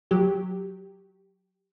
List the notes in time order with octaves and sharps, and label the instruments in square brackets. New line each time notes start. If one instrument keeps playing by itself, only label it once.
[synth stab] F#3 G4